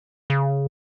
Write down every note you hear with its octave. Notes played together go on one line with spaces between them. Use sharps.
C#3